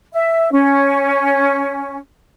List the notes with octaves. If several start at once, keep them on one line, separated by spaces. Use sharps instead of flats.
E5
C#4